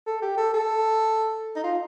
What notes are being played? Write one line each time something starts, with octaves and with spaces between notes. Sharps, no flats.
A4
G4
A4
A4
D#4
F4